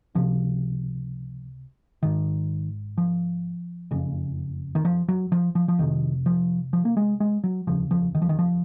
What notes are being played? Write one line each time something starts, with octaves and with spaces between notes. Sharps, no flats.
C#2 C3 F3
G#1 G#2 D#3
F3
F#1 F2 C#3
D#3
F3
F#3
F3
F3
F3
F1 F2 C3 D#3
F3
F3
A#3
G#3
G#3
F#3
F1 D#2 C#3 F3
F3
D#3
F3
D#3
F3